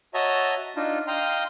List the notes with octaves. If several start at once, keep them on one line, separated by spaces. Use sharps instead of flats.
F#4 C#5 D#5 E5 A5 A#5
D4 D#4 F4
D#5 F5 G5 A#5 C6